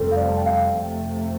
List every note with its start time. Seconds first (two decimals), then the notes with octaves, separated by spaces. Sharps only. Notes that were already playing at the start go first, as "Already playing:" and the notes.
Already playing: F1 F2 C3 G3 C4 A4
0.11 F5
0.16 D5
0.29 A5
0.37 G5
0.46 F5
0.76 F2 C3 A3 G5